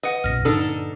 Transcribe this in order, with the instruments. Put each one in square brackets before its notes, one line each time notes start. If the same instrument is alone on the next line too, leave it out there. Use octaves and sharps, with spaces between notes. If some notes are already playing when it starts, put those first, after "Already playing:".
[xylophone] B4 F#5 [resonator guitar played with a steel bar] D#5
[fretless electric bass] B1 F#2 A#2 [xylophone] F6 A#6
[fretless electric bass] G2 A#2 D3 [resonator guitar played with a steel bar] D4 D#4 A4